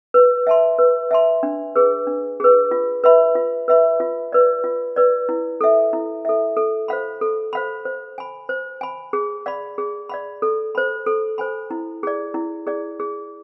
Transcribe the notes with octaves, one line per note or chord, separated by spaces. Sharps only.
B4
E5 A5 C6
B4
E5 A5 C6
D4
G#4 B4
D4
G#4 B4
F4
B4 E5 B5
F4
B4 E5 B5
F4
B4 D5
F4
B4 D5
E4
A4 E5
E4
A4 E5
A4
C5 F5 B5
A4
C5 F5 B5
C5
G#5 B5
C5
G#5 B5
G#4
D5 F5 B5
G#4
D5 F5 B5
A4
C5 G#5 B5
A4
C5 G#5 B5
E4
G#4 D5
E4
G#4 D5
G#4